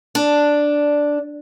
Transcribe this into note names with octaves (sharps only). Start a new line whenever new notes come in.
D4